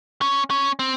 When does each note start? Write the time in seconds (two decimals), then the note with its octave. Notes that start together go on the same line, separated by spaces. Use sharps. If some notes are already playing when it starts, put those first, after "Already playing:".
0.22 C#4
0.50 C#4
0.79 C4